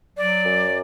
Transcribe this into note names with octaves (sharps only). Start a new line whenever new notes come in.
F#3 D5
F#2